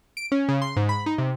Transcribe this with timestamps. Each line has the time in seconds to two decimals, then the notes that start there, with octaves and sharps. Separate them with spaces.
0.17 D7
0.32 C#4
0.49 C#3
0.62 C6
0.76 G#2
0.89 B5
1.06 D#4
1.18 C3